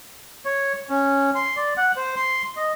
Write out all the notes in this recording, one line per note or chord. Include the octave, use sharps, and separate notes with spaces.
C#5
C#4
C6
D5
F#5
C5
C6
D#5